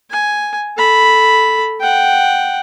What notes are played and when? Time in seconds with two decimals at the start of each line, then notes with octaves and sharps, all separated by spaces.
0.10 G#5
0.78 A4 B5
1.80 F#5 G5